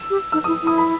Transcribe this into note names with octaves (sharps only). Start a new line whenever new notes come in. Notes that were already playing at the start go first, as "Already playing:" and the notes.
Already playing: E6
G4
D#4 E6
E4 D#6
E4 D#6
B5